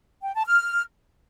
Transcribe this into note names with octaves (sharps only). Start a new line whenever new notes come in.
G5
A5
F6